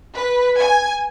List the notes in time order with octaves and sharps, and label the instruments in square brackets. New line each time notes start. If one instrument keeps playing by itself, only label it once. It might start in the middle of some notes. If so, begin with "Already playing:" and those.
[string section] B4
G#5